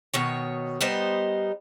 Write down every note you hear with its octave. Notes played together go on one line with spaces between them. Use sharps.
B2 D#3 C#5
G3 B3 D#4 C5